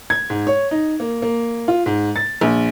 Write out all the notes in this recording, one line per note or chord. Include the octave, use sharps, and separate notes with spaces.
G#6
G#2
C#5
D#4
A#3
A#3
F4
G#2
A6
A#1